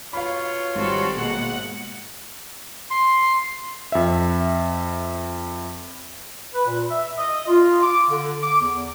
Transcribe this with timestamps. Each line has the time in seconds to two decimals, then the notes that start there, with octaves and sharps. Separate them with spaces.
0.13 B2 F4 C#5 F5 B5
0.75 G#1 G3 F#4 A4 C5
1.17 B2 G#3 A#3 F#5
2.91 C6
3.92 F2 E5
6.54 B4
6.66 A#2
6.89 E5
7.18 D#5
7.47 F4
7.83 D6
8.09 D3
8.43 D6
8.61 E2